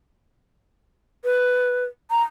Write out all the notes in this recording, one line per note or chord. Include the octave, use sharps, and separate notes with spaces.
B4
A#5